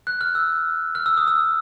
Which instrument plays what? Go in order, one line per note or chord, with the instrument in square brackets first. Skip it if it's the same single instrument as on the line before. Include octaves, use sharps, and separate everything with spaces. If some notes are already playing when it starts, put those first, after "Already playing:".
[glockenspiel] F#6
F6
E6
F6
E6
D#6
E6